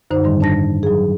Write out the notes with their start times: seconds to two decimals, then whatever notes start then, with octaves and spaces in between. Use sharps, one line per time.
0.11 F#2 D3 D#4 C5
0.24 G#2 D3 D#3 G3
0.40 D4 A5 A#6
0.83 F#3 G#4